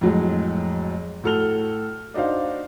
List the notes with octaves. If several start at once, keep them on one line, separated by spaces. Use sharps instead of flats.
F2 A2 F#3 G#3
A2 F#4 A4 F6 F7 G7
D4 D#4 F#4 C5 F5